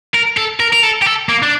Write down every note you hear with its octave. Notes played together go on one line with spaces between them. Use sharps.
A#4
A4
A#4
A#4
A4
G4
A4
A#3
D4